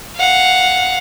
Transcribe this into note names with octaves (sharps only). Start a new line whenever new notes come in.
F5 F#5